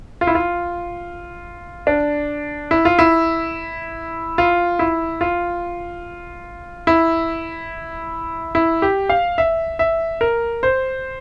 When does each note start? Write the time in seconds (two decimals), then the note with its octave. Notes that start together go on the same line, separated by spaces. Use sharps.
0.21 F4
0.27 E4
0.35 F4
1.87 D4
2.71 E4
2.85 F4
2.99 E4
4.38 F4
4.79 E4
5.21 F4
6.87 E4
8.55 E4
8.82 G4
9.10 F5
9.38 E5
9.79 E5
10.21 A#4
10.63 C5